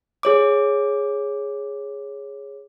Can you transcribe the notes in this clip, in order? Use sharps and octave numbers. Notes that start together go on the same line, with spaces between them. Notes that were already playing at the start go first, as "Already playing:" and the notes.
G#4 C#5 D6